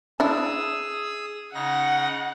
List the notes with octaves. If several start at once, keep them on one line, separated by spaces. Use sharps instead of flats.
D4 E4 G#4 D#6 E6
C#3 D#4 F#5 A#6